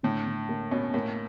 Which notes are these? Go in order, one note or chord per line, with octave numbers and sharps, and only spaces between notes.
A2 D3
D3
A#3
B2 C#4
A2 A#3